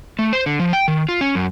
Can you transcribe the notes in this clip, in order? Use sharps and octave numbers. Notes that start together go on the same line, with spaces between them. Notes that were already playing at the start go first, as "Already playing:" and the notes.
A3
C5
D3
F3
G5
D#3
F4
C#4
F#2